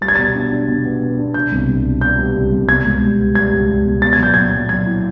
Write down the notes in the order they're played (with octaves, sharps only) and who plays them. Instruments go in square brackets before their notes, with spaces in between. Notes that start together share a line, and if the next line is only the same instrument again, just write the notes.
[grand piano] G3 A6
G#6
B2 A6
D4
D4
B2
B3
B3
D4
B2 G6
C2
C2
B2
B3 G6
G3
C2
C2
B2 G#6
C#2
G3
B3
G3 G#6
C#2
C#2
B2
B3 A6
G#6
F#3 G6
A#2 G#6
F#3
F#3 G#6
E4